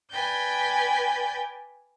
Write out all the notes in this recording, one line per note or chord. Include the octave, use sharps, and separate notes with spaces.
B4 D5 G5 G#5 G6